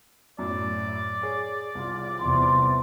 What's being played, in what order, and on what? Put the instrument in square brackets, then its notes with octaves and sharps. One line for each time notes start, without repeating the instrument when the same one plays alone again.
[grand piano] F#2 A2 [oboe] D5
[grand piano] G#4 C#5
C2 F4
[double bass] E2 C3 [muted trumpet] C6